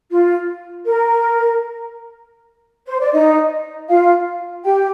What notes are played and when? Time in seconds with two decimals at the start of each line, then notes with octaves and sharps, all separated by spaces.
0.11 F4
0.86 A#4
2.87 C5
3.00 D5
3.13 D#4 D#5
3.89 F4 F5
4.65 G4 G5